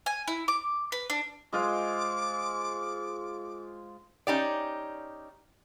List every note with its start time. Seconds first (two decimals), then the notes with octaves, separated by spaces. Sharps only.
0.06 G#5
0.28 E4
0.48 D6
0.92 B4
1.10 D4
1.53 G#3 F4 C5 D6
4.27 C#4 D#4 G4 D5